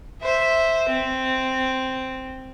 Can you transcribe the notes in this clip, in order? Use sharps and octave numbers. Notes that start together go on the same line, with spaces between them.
C5 E5
C4